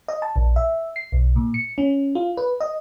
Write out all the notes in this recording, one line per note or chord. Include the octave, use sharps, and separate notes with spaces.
D#5
A5
A#1
E5
C7
B1
A#2
C#7
C#4
F4
B4
D#5